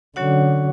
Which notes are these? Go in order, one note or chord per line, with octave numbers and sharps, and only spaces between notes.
D3 F#3 C#4 F#4 C#5 F#5